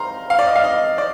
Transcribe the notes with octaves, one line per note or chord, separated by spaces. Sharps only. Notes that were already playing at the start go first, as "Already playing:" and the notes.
Already playing: F5 A#5 C6
F5
D5
D#5
F5
D#5
D5